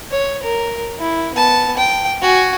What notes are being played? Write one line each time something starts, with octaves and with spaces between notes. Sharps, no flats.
C#5
A#4
E4
B3 A5
G5
F#4 G#5